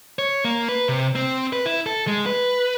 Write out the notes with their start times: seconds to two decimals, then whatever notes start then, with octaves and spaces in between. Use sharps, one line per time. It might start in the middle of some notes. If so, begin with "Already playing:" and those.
0.19 C#5
0.45 A#3
0.69 B4
0.89 C3
1.16 C4
1.53 B4
1.66 E4
1.86 A4
2.07 G#3
2.26 B4